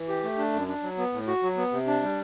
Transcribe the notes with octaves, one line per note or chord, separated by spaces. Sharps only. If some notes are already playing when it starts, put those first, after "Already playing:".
Already playing: E3
G4
A3
D4
F#2
D4
F#3
B3
A2
F#4
F#3
B3
C3
D4
G3